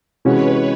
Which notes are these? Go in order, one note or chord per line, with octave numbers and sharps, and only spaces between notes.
C3 E3 G#3 C#4 F#4 B4 C#5